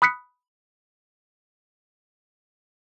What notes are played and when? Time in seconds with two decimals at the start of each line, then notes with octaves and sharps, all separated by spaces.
0.02 B5 D#6 F#6 B6 C#7